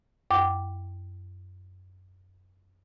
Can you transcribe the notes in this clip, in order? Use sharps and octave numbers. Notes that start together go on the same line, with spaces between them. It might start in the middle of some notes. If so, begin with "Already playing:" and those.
F#2 G5 D6